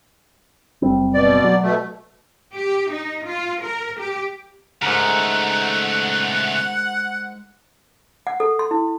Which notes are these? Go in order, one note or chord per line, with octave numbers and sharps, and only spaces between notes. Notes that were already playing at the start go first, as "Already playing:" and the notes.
F#1 G3 C4
B2 D5
F#3
B2 A3
G4
D#4
F4
A#4
G4
G#2 C#3 A3 A#4 F#5
F#5
A4
C6
E4